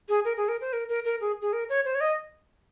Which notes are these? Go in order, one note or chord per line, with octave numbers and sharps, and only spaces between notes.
G#4
A#4
G#4
A#4
C5
A#4
A#4
A#4
G#4
G#4
A#4
C#5
C5
C#5
D#5